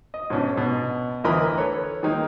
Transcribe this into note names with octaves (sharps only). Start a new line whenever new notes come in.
D#5
G#2 B2 C#4 D4
B2
D2 E3 A#4 D#5 A#5 B5
A4 B4 C#5
D#3 G#3 A#3 D#4